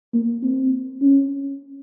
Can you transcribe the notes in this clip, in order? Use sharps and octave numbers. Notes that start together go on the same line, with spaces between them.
A#3
C4
C#4